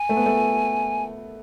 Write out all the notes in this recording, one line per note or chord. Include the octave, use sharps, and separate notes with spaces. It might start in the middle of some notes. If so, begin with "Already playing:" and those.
Already playing: G#5
A3
B3
A3